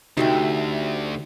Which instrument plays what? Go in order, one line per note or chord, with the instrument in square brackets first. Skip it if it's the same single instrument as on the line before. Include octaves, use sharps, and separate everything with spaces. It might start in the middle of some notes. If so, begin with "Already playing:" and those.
[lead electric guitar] D2 [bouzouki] C3 A3 G5 [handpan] D#4 F#4